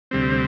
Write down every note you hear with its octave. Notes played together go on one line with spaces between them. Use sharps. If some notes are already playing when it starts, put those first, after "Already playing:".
D2 C3 G3 C4